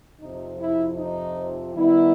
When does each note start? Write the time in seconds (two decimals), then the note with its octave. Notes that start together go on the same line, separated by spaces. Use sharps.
0.20 F2 C3 F3 D#4
0.59 E4
0.97 D#4
1.74 D#3 G3 B3 D#4 E4